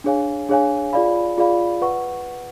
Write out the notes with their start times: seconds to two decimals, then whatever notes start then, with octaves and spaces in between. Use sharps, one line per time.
0.04 D4 G#4 C#5 F5 G#5
0.49 D4 G#4 C#5 F5 G#5
0.93 F4 G#4 D5 F5 B5
1.38 F4 G#4 D5 F5 B5
1.82 B4 F#5 C#6